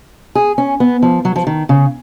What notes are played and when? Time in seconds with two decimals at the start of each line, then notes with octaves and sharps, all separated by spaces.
0.35 G#4
0.58 C#4
0.80 B3
1.02 F3
1.25 F#3
1.36 F3
1.47 D#3
1.69 C#3